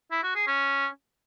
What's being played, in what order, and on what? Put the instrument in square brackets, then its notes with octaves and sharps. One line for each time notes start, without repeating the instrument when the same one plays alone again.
[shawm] E4
F#4
G#4
C#4